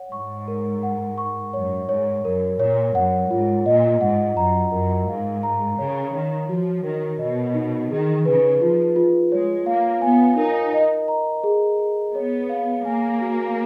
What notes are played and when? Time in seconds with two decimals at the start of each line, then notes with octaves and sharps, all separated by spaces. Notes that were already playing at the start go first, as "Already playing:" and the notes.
Already playing: C#5 F#5
0.12 G#2 C#6
0.48 A#4
0.83 F#5
1.18 C#6
1.54 F#2 C#5
1.89 G#2 C#5
2.24 F#2 A#4
2.59 A#2 C#5
2.95 F#2 F#5
3.30 G#2 F4
3.66 A#2 D#5
4.01 G#2 F#5
4.37 F#2 A#5
4.71 F#2 A#4
5.08 G#2 F5
5.43 A#5
5.78 C#3 C#5
6.13 D#3 C#5
6.48 F3 F#4
6.84 D#3 A#4
7.19 B2 D#5
7.55 D#4
7.90 D#3 G#4
8.25 C#3 B4
8.60 F3 F4
8.96 F4
9.32 G#3 C#5
9.66 A#3 F5
10.02 B3 G#5
10.37 D#4 A#4
10.73 D#5
11.08 A#5
11.44 G#4
11.79 G#4
12.14 B3 C#5
12.49 F5
12.85 A#3 G#5
13.21 F#4